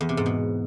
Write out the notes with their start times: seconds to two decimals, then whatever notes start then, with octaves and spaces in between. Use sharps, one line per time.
0.01 E2
0.09 C3
0.17 G#2
0.26 B2